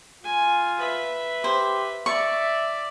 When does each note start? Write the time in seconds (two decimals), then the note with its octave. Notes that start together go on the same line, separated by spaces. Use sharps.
0.24 F4 G#5
0.77 B4 E5
1.44 G4 C5
2.06 D5 E5 C#6